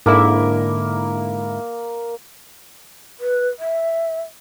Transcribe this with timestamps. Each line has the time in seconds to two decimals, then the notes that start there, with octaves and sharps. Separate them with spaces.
0.06 G#2 D3 A#3 E4 A#4
3.20 B4
3.59 E5